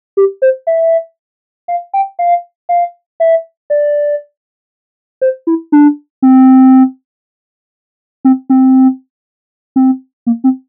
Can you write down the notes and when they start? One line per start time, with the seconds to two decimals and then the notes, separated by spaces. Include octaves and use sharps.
0.17 G4
0.42 C5
0.67 E5
1.68 F5
1.94 G5
2.19 F5
2.69 F5
3.20 E5
3.70 D5
5.21 C5
5.47 E4
5.72 D4
6.22 C4
8.25 C4
8.50 C4
9.76 C4
10.26 A#3
10.44 C4